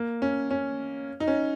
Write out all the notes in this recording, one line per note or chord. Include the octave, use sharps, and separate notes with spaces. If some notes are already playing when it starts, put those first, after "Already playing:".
Already playing: A#3
C#4
C#4
D#4
C#4